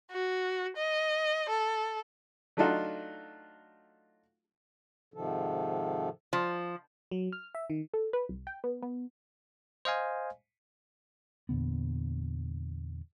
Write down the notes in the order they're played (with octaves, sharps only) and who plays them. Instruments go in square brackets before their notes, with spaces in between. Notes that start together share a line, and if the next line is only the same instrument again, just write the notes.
[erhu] F#4
D#5
A4
[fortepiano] F#3 A3 D4 D#4 F4 F#4
[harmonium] G#2 C3 D#3 F3 A4
[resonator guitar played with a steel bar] F3
[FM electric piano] F#3
F6
E5
D#3
[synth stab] A4
B4
C2
G5
B3
B3
[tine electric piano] C5 D#5 F5 G#5
[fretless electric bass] E2 A#2 D3 B3